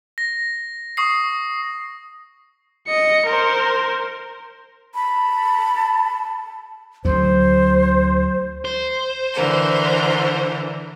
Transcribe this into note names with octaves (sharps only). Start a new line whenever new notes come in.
A#6
C#6 D#6 C7
D#5 C#7
A#4 C5
A5 B5
D2 F#3 C5
C5
D3 E3 A#4